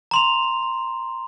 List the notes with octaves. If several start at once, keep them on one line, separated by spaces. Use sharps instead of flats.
A#5 C6 F7